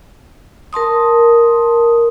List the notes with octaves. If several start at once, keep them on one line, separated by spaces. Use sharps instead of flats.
A#4 A5 C6 D#6